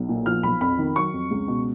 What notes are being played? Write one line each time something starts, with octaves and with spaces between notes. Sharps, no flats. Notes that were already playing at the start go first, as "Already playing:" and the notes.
Already playing: B1
A#2
F3 F6
B1 B5
F2 B5
D#3
F#3 C#6
F2
C#2
B2